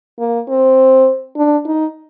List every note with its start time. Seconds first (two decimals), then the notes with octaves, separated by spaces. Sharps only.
0.19 A#3
0.48 C4
1.37 D4
1.65 D#4